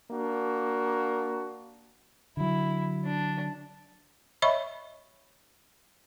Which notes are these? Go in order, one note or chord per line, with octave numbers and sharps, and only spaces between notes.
A#3 D4 F#4
D3 F#3 E4
D4
C#5 D#5 E5 B5 C#6